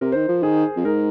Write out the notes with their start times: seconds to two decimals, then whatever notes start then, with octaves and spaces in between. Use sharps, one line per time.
0.01 C3 A#4
0.12 C5
0.15 D#3
0.29 F3
0.43 D#3 G#4
0.76 F2
0.85 G#2 A#4